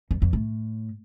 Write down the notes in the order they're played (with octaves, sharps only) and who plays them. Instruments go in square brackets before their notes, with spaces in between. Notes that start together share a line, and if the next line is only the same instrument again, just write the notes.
[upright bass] F2
F2
A2